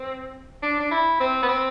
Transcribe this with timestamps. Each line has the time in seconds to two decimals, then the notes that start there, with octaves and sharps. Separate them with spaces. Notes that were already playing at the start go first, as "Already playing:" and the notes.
Already playing: C4
0.63 D4
0.80 D4
0.91 E4
1.20 C4
1.42 B3
1.48 C4